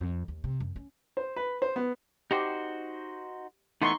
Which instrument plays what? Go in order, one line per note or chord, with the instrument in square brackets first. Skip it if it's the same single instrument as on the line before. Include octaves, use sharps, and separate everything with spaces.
[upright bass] F2
D#2
C3
F#2
C#4
[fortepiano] C5
B4
C5
B3
[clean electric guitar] D#4 F#4 C5 [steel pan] G4
[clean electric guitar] E3 A3 B3 [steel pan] D#4 C6 C#6